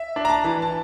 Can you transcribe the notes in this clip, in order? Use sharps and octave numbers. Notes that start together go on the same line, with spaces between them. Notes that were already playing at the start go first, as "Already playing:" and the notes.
Already playing: E5
D4
A#5
A5
E3
A5